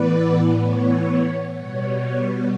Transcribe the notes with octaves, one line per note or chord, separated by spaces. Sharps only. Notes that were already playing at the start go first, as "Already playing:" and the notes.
Already playing: A2 E3 B3 B4 D5
C#5
B2 G3 B3 C#5